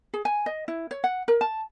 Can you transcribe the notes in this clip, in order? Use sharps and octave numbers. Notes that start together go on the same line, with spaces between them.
G#4
G#5
D#5
E4
C#5
F#5
A#4
A5